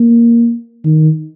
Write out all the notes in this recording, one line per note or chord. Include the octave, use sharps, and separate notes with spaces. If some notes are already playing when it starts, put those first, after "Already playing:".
Already playing: A#3
D#3